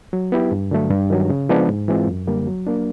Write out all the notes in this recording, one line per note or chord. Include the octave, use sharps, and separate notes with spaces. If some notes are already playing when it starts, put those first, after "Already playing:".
F#3
B3 E4 G4
G2
D3 F#3 A3
G2
D#3 F#3
C#3
F3 G#3 B3 D4
G#2
E3 G#3 C4 F4
F#2
D3 G3 A#3
F#3
A#3 D4